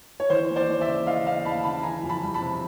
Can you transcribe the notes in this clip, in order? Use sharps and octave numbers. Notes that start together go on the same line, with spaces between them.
C#5
E3 C5
D#2
C5 D5
D#2
D5 E5
C#3
E3 D#5 F5
D#2 D#5 F5
D#2 A5 B5
C#3 A5 B5
E3 G#5 A#5
F2
A5 B5
G3
A5 B5
C3